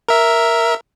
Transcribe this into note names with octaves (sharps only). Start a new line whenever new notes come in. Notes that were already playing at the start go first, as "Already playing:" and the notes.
A#4 E5